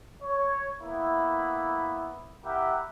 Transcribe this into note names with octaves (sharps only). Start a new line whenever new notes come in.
C#5
A#3 B3 E4
E4 G4 A#4 E5 F#5